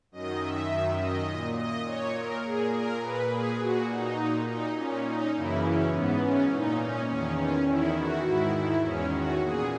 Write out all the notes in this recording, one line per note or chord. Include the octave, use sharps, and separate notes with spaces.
F#2 D#3 D#5
E5
F#2 D#3
D#5
A#2
D#5
A#2 C#5
A#4
A#2 G#4
A#4
A#2 B4
G#4
A#2 F#4
D#4
A#2
D#4
A#2 C#4
D#4
F#2 C#3 E3 E4
C#4
G#2 E3 B3
C#4
A#2 D#4
C#4
E2 D#3 C#4
C#4
E2 D#3 E4
F#4
G#2 D#3 E4
E4
E2 D#3 C#4
F#4
A#2 G#4